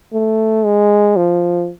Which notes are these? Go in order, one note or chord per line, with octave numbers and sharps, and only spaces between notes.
A3
G#3
F3